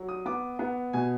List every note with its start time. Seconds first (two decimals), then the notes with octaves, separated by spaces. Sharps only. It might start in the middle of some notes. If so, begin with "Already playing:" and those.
Already playing: F#3
0.09 D#6
0.26 B3 D6
0.59 B3
0.93 B2 G#5